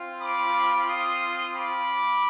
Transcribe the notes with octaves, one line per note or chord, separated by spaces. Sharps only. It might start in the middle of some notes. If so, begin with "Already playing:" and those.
Already playing: C4 F4
B5 D6
C6 D#6
B5 D6